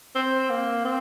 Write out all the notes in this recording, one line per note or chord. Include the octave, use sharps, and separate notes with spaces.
C4
A#3
C4